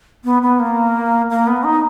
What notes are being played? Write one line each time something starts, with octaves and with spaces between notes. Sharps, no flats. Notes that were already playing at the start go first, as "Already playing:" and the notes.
B3
B3
A#3
A#3
B3
D#4